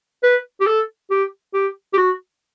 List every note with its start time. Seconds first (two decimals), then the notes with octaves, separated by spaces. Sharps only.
0.23 B4
0.61 G4
0.67 A4
1.11 G4
1.54 G4
1.94 G4
1.98 F#4